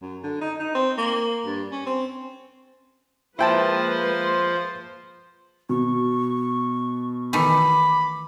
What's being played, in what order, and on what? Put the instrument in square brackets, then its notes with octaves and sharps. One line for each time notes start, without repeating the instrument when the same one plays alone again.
[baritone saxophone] F#2
D3
D#4
D#4
C4
A#3
G2
C#4
C4
[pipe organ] F3 [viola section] G#3 A#3 B4 [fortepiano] E4 G5 A5 [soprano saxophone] C5
[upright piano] B2 [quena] C#6
[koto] D#3 E3 A3 [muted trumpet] B5 [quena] D6